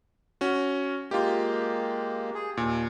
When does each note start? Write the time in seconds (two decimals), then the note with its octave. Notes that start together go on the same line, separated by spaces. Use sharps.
0.41 C#4 F#4
1.11 G#3 A#3 F4 G4
2.34 G#4
2.57 D#2 A#2